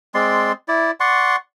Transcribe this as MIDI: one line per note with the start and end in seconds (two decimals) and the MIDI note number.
0.14 0.52 56
0.14 0.52 60
0.14 0.52 74
0.14 0.52 84
0.68 0.91 64
0.68 0.91 74
1.00 1.36 74
1.00 1.36 78
1.00 1.36 84
1.00 1.36 85